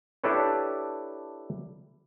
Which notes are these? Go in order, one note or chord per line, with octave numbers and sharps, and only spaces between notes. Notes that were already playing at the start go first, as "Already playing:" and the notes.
D4 E4 G4 A4 B4 C#5